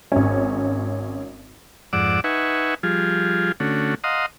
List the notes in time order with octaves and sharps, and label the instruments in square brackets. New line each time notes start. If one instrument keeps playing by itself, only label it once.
[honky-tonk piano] G#1 C#4
[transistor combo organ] F2 G#2 D5 F#5 D6 E6
D#4 B4 E5 F#5 G#5 C#6
F3 G3 F4 G#4
D3 A3 C#4 F#4
D#5 F5 F#5 A#5 C6 D#6